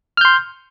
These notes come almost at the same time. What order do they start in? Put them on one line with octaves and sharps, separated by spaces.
F6 G6 C6